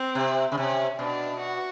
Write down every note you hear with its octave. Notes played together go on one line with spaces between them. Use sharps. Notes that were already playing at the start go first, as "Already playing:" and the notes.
Already playing: C4
C3
C#3
C3 C#4
B2 D4
F#4